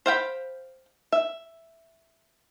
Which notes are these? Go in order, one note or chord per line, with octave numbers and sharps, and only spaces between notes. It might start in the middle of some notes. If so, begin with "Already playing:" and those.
C5 F5 G5 B5
E5